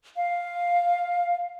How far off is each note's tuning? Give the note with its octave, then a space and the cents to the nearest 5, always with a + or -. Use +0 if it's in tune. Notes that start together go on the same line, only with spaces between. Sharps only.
F5 +5